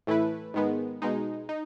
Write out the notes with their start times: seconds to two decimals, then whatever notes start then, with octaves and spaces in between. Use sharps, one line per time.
0.07 A2 E3 A3 E4 B4
0.54 G#2 D#3 G#3 B3
1.02 B2 G#3 D#4
1.49 D#4